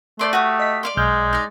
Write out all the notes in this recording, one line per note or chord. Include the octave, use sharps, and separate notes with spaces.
A3 C5 D5 C6
F#4 G4 D#6
D#5 B6
D5 F5 C6
B1 G#3 F6 G6
D#4 D5